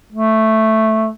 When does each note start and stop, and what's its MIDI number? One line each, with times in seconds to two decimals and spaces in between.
0.12 1.09 57